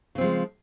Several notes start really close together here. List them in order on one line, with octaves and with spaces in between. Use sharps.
C#3 C4 F3 G#3